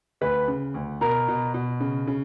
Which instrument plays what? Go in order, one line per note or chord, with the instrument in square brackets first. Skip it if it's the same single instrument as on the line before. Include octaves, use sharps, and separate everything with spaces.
[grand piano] D2 [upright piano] B4
[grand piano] C#3
D2
[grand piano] B2 [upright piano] A#4
[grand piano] B2
B2
C#3
C#3